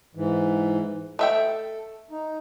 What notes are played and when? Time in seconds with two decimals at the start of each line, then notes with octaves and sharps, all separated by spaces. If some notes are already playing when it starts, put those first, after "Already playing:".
0.15 G#2 E3
1.19 A3 A4 E5 G5
2.11 D#4